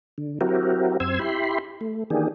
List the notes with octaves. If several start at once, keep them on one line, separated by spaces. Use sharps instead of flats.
D3
F#3 C4 E4 F#4 G4 A#4
F#2 C4 C6 E6 G#6
E4 G4 B5 C6
A3
D#3 E3 A#3 D4 G4 G#4